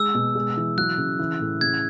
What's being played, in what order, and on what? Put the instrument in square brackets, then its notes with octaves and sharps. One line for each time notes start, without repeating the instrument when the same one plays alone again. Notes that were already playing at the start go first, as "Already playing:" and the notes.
Already playing: [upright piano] G#3 [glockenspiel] E6
[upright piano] B2
G#3
E3
[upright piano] F#3 [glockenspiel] F#6
[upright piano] C#3
E3
A2
[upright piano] C#3 [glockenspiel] G#6